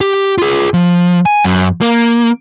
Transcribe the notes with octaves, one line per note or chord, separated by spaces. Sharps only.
G4
F4 G#4
F3
G#5
F#2
A#3